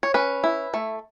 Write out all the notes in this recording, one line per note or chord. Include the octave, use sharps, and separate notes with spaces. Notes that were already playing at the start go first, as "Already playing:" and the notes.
C#5
C#4 B4
E4
A3